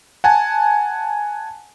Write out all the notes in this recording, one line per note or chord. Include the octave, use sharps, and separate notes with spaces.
F#5 G#5 A5